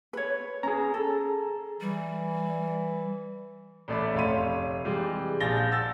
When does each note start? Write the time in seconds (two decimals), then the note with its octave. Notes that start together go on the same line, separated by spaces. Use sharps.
0.13 B4 C#5
0.63 C#4 G#4 A#5
0.94 A4
1.81 E3 G3
3.88 A1 A3 D5 E5 B5
4.15 F1 C#5 F5 C6 D#7
4.85 C3 E3 G3 G#3
5.40 A#1 F5 G#5 A6 A#6 G7
5.71 F#5 E6 A6